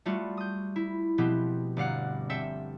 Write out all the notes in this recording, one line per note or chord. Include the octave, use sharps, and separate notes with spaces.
G3 A3 F4 F#4
D#6 G6
E4
B2 F3 B3 C4 G4
G1 D5 F5 F#5
C4 A4 E5 G5